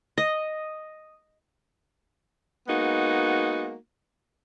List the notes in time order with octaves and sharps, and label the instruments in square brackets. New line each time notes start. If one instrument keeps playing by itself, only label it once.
[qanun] D#5
[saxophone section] G#3 A#3 B3 D#4 F#4